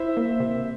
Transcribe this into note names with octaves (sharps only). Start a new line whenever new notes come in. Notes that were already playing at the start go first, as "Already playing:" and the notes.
Already playing: E4 C5 E5
A#3
C3